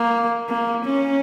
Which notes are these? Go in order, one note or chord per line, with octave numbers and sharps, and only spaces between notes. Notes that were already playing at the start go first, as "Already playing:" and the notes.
Already playing: A#3
A#3
C#4